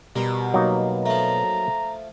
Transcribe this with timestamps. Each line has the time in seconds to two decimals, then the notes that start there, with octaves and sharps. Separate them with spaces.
0.16 B2 G3 A#4 C6
0.54 F#3 A#3 D#4
1.06 F3 A3 A#5